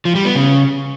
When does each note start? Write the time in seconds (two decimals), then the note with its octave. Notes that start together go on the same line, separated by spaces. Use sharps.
0.05 F3
0.15 G3
0.25 B3
0.35 C#3